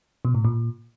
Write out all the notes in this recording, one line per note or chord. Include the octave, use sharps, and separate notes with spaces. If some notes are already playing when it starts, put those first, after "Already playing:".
B2
A2
A#2